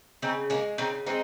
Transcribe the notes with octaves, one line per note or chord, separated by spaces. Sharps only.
C#3 C4 D#4
G#3 A#3 C#4
C#3 C4 D#4
G#3 C4 D#4